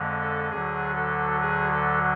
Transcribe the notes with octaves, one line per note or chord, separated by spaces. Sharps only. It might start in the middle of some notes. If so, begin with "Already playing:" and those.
Already playing: F2 D3 G#3
A4
D2 D3 F#3 G#4
A4
G#4
A4